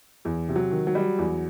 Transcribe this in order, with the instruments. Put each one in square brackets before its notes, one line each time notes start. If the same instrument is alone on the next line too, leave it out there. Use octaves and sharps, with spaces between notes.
[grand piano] E2
C3
[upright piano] F#3
[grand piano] D#3
[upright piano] F#3
[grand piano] G3
E2